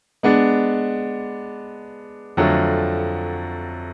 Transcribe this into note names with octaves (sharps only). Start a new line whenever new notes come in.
G#3 B3 D4
F2 D3 F#3 A3